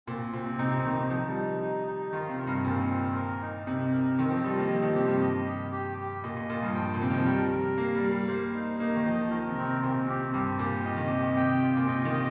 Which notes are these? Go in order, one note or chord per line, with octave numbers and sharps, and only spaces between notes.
A#2 C4
A#2 C4
C3
C3 D#4
C3
D#3 D#4
F3 D#4
G3
D#4
D#4
D#4
D#3 F4
C3
A#4
G2
A#2 C4
C4
A#4
D#4
C3 D#4
A#4
D#3 C4
F3
G3 D#5
A#3
F3 C4
D#3
C3 G4
G2
D#5
G4
G4
G4
A#2 D#5
A#2
A#2 F4
G2
F3 G5
A#2
C3 G5
D#3
F3
G3 A#4
A#4
A#3 F5
G3
F5
G3
A#3 C5
D#4
A#3 D#4
D#3
F3 D#5
D#3 A#4
C3
C4
C3
A#2 C4
C3 G4
G2 G4
A#2 G4
C3 D#5
D#3
C3 G4
C3 G5
F4
A#2
C3 D#5
D#3
D#5